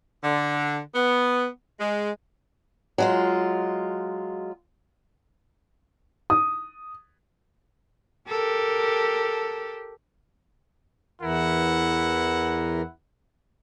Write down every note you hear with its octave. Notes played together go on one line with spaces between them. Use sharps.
D3
B3
G#3
F#3 G#3 F4
D#6
G4 A4 A#4
E2 E3 E4 A#4 F#5